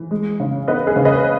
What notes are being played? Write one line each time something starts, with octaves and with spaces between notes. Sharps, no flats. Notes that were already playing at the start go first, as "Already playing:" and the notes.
Already playing: E3
G#3
C#3
B3 B4 D#5
G#4 B4
C#3
B4 D#5